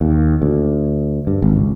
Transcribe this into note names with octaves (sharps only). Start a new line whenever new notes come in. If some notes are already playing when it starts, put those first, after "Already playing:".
D#2
D2
G2
G#1
C#2